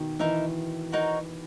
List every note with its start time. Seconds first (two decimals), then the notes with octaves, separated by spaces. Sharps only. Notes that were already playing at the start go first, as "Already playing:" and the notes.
Already playing: B2 D#3
0.19 E3 D#4 A#4 E5
0.92 D#4 F#4 A#4 C#5